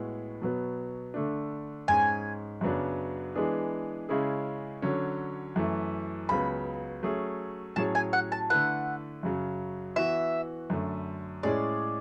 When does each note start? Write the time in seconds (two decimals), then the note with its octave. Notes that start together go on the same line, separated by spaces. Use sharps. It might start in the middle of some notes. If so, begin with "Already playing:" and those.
Already playing: A2 G#3 B3 F#4
0.42 B2 F#3 B3
1.14 D3 A3 D4
1.88 G#2 G#3 C#4 G#5
2.61 F#2 C#3 F#3 B3 D4
3.35 E3 G#3 B3 D4 G#4
4.09 C#3 G#3 C#4 E4 G#4
4.82 D3 F#3 C#4
5.56 F#2 E3 A3
6.29 C#2 C#3 F#3 B3 B5
7.03 F#3 A3 C#4 G#4
7.76 A2 F#3 C#4 G#4 C#5 A5
7.95 G#5
8.13 F#5
8.32 A5
8.50 D3 A3 E4 B4 F#5
9.23 F#2 C#3 F#3
9.96 E3 B3 F#4 E5
10.70 F#2 D3 A3
11.43 A2 G#3 C#4 G#4 C#5 D5